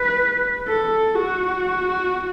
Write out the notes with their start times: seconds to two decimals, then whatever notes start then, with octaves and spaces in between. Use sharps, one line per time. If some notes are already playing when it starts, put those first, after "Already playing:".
Already playing: B4
0.69 A4
1.15 F#4